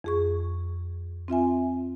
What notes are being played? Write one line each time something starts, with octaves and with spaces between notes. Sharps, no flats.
F2 G#4 C#6
C4 F4 E5 G#5